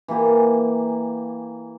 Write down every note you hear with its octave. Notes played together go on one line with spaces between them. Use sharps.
E3 A#3 G4 G#5